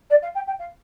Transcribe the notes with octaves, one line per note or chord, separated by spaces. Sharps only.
D5
F5
G5
G5
F5